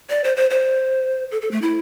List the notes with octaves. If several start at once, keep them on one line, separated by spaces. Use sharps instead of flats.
D5
C5
C5
C5
A4
A4
A3
E4